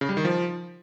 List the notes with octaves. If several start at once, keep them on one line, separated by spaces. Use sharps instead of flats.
C#3
G3
D#3
F3